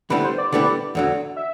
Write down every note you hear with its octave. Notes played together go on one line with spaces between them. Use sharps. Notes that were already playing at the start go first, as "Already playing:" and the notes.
D3 G3 B3 E4 B4
C5
D5
D3 G3 B3 E4
E2 D3 F#3
E5